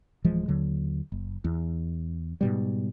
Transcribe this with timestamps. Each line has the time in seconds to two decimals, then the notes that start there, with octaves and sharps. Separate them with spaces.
0.24 D1 E3 F3 G#3
0.48 D#2 D3 F#3
1.12 F#1
1.44 E2
2.41 G#2 B2 G3